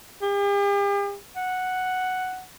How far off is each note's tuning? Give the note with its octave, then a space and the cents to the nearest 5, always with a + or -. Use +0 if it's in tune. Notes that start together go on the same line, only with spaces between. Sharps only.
G4 +45
F#5 +0